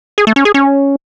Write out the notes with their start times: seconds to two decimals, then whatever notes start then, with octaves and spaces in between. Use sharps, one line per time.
0.18 G#4
0.27 A3
0.36 C#4
0.45 G#4
0.54 C#4